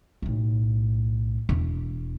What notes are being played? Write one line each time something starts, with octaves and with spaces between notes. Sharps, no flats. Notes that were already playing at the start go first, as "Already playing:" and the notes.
B1 A2
E1